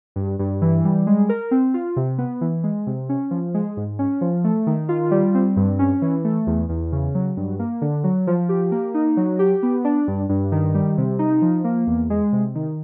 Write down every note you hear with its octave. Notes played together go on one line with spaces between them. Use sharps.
G2
G2
E3
G3
G#3
A#4
C4
F4
C3
B3
E3
G#3
C3
C#4
F3
G#3
G#2
C#4
F3
A3
D#3
F4
G3
C4
G2
C#4
E3
A3
E2
E2
C#3
F#3
G2
A#3
D3
F#3
F3
G4
A#3
D#4
F#3
G4
B3
D4
G2
G2
D#3
G3
C3
D#4
F3
A#3
E2
G#3
C3
D#3